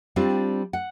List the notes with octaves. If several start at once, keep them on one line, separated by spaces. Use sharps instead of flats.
G3 C4 D4 F4
F#5